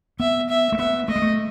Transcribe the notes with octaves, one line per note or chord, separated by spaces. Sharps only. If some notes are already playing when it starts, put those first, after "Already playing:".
B3 E5
E5
A3
B3 E5
A3 D#5
G#3
A3